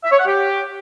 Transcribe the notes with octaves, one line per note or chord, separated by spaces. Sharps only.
E5
C#5
F#5
G4